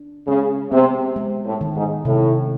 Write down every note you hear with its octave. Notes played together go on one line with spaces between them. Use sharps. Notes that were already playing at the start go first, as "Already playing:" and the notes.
Already playing: D4
C#3 G#3
C3 B3
G#3
A2
D#3
G#2
A2 C3